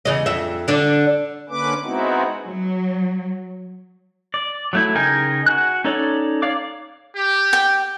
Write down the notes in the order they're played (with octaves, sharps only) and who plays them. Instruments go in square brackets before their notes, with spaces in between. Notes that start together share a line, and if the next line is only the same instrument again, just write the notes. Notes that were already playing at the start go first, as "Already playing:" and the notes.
[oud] E2 C#3 D#5
F2 E5
D3 D4
[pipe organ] D3 A#3 C#4 B4 D6
G#3 B3 C4 D#4 E4 F#4
[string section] F#3
[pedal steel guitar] D5
F#3 A3 E4
C#3 D#4 A#4 G5 G#5
F#4 G#5 F#6
C#4 D#4 A4 C#5 D5
C#5 D5 F5 D6
[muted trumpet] G4
[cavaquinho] G5